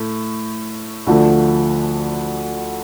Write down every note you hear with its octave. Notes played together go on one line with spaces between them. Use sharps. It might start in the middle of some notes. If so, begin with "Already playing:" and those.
Already playing: A2 A3
D2 D3 F3 A3